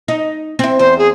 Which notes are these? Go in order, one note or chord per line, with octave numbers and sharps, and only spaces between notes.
D#4
C4 E4
E2 C5
G#4